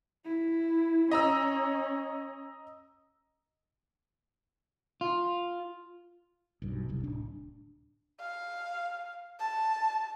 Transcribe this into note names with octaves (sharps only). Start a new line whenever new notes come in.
E4
C#4 D#5 A#5 E6
F4
B1 G2
F1 C2
D1 D4
F5
A5